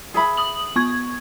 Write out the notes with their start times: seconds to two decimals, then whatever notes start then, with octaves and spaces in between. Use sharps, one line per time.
0.14 G#4 E5 B5
0.37 D#6 F#7
0.76 B3 C#6 G#6